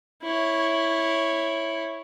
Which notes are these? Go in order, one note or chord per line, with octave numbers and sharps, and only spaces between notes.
E4 C#5